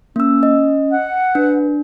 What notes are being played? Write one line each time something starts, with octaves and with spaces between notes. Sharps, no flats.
A#3 C#4 E6
D#5
F#5
D4 B4